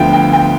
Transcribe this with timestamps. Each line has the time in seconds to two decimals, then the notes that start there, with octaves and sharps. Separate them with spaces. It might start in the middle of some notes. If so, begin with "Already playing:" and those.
Already playing: D2 D3 F3 B3 F5 G5
0.13 G5
0.33 G5